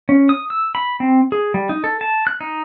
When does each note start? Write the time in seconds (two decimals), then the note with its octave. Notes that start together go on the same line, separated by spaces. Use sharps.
0.09 C#4
0.29 D#6
0.50 E6
0.75 B5
1.00 C4
1.32 G#4
1.54 G3
1.69 D#4
1.84 A4
2.01 A5
2.27 F#6
2.41 D#4